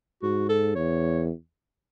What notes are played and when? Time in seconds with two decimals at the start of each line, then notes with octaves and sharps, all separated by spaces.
0.23 G#2 F#4
0.49 A4
0.75 E2 C#5